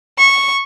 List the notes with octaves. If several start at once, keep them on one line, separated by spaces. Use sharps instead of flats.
C#6